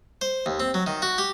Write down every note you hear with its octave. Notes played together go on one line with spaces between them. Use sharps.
C5
D#2
C4
F#3
D#3
F#4
G4